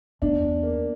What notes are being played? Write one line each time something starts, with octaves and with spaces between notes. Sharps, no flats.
E2 D4
A#3